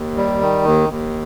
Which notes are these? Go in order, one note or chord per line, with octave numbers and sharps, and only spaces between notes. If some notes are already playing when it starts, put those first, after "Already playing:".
Already playing: D#2
G3
D#3
D#2
D#2